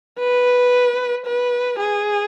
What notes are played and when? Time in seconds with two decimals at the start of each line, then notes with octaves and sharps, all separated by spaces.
0.19 B4
1.26 B4
1.79 G#4